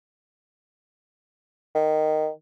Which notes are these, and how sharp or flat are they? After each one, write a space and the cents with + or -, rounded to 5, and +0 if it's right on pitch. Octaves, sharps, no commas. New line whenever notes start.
D#3 -10